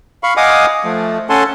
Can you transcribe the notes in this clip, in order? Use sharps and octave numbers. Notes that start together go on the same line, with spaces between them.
F5 B5 C#6
D#5 F5 F#5 G#5 D6 D#6
F3 A3
C#4 A4 F#5 G#5 A5 C6